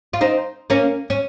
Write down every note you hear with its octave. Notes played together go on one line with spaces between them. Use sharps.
F4
C4 D#4
A#3 C#4
C#4